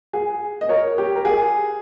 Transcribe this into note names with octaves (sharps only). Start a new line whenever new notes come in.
G#4
D#5
A#4 C#5
G4
A#4
G#4